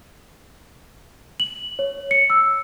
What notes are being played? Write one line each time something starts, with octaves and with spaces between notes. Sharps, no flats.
F#7
C#5
C#7
E6